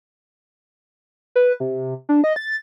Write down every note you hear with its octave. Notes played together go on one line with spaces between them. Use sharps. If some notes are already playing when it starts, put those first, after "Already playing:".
B4
C3
D4
D#5
A6